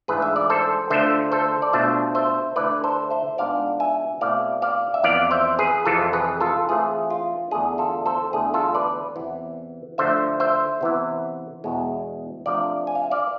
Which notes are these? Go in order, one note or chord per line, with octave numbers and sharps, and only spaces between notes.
G#2 E3 A3 D4 F4 G#4 B4
E5
D5
A4 C5
D3 A3 D4 F4 C5 E5
A4 C5
D5
B2 A3 D4 F4 C5 E5
C5 E5
D3 A3 E4 B4 D5
A4 C5
C5 E5
G#2 G#3 B3 D4 F4 D5 F5
E5 G#5
B2 A3 C4 E4 D5 F5
D5 F5
E5
F2 E3 B3 D5 F5
C5 E5
G#4 B4
F2 C3 E3 F4 A4
G#4 B4
F4 A4
E3 A3 C4 F4 G#4
F4
E2 D3 A3 D4 G#4
F4 A4
A4 C5
E2 D3 A3 G#4
F4 A4
B4 D5
E2 C3 E3 B3
D3 F3 A3 C5 E5
C5 E5
C3 E3 B3 E4
E2 B2 G#3
C3 F3 A3 D4 D5 F5
G#5
F5
E5
D5 F5